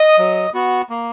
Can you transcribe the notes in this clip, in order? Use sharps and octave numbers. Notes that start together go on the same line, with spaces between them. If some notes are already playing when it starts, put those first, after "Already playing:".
Already playing: D#5 D#6
F#3
B3 F#4
A#3